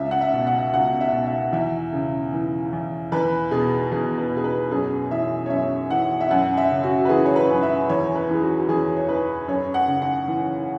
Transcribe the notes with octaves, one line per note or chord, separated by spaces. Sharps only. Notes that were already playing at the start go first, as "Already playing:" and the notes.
Already playing: C#2 E5
F#5
E5
B2
F#5
C#2 F#5
E5
B2
E5
E2 E5
C#3
E3
E2
E2 B4
B2 G#4
E2 G#4
B4
B2
G#4
B4
F#2 G#4
E3 E5
C#5
F#2 E5
E3 F#5
E5
F#2 F#5
E5
C#3
F#4
B4
E3 G#4
C#5
B4
F#2
E5
E2 C#5
B4
E3 G#4
F#4
E2 G#4
C#5
E3 B4
F#2 C#5
F#5
C#3
F#5
E3